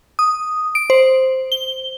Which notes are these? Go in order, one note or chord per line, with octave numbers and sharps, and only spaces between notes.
D#6
D7
C5
G7